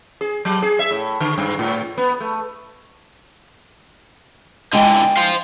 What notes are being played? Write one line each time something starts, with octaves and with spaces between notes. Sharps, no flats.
G#4
F#3
G#4
E5
A2
D3
G2
A2
B3
A3
D3 E3 G#3 G5
C5 F5